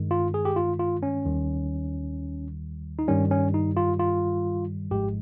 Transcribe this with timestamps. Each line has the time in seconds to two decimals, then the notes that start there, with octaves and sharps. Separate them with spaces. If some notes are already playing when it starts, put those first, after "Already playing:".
Already playing: G2 D#3 G#3
0.11 F4
0.34 G#4
0.45 G4
0.56 F4
0.80 F4
1.03 C#4
1.25 D#2 D#3 G3
2.99 D#4
3.08 G2 D#3 G3 C#4
3.31 C#4
3.54 D#4
3.77 F4
3.99 F4
4.91 G#1 G#2 F3 G#3 G4